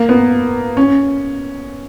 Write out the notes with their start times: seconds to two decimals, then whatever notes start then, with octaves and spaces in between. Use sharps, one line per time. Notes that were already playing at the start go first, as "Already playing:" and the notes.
Already playing: A#3
0.09 B3
0.77 C#4